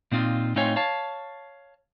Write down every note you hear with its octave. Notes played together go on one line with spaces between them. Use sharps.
A#2 C4 D#4 F4
A2 C4 D#4 F4 C#5 G#5
C#5 F5 A5